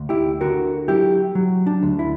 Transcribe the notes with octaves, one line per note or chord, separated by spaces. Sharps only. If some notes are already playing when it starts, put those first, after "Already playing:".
Already playing: D2
E4 G4
D3 F#4 A#4
F#3 E4 G4
F#3
D4
D2
E4